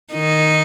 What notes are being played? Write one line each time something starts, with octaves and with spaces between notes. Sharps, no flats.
D#3 D#4